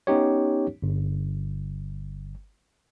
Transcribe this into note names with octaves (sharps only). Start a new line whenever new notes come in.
B3 C#4 D#4 G4 C#5
G1